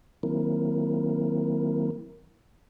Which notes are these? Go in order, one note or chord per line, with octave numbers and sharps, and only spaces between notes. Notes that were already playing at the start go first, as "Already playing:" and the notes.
D#3 F#3 A#3 C4 E4 A#4